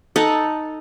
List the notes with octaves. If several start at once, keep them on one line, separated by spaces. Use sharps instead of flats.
D#4 A4 F#5